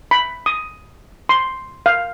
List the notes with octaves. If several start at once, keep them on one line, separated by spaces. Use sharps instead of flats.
B5
D#6
C6
F5